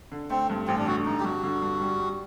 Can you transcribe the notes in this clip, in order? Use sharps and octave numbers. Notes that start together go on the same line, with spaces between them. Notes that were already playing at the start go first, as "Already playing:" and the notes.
D3
A3 C4
G2
A1 C4
D4
D3 F#4
G2 D#4
G4
G2 F#4
D3
G2
G3
G3